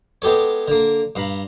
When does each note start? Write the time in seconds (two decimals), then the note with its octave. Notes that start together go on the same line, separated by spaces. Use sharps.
0.22 G#3 B3 G4 A4 C#5
0.68 D3 A#3
1.16 G2 F5 A#5 B5